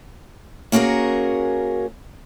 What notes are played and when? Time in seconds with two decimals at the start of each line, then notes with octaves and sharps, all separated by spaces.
0.72 A#3 C#4 F#4 G#4 A#4